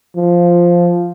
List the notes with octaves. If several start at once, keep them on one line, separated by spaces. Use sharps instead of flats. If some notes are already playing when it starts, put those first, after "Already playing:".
F3